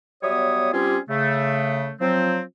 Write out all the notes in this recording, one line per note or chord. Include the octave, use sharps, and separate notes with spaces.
F#3 G3 B3 C#5 E5 D#6
G3 C4 C#4 F4 G4 G#4
C#3 A3
F3 F#3 C4